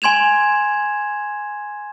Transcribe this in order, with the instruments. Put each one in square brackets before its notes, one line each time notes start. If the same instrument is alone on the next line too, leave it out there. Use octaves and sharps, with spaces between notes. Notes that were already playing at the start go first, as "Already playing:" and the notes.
[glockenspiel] G#5 C6 G#6 E7 F7